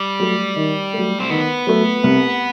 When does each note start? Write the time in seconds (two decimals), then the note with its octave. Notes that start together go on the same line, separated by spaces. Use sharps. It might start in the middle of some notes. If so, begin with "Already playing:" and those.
Already playing: G3
0.20 F#3 A3
0.56 D#3
0.93 F#3 A3
1.20 C4
1.30 D#3 B3
1.67 F#3 A3
2.04 C2